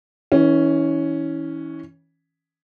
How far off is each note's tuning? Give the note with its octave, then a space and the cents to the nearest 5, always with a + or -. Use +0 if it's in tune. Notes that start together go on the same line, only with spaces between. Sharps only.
E3 -35 C#4 +0